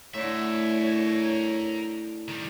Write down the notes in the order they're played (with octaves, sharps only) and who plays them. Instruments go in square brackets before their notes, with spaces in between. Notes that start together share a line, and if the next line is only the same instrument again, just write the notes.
[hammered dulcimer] A2 D3 [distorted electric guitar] A#4 E5 [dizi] C#5
[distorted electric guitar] D#3 G3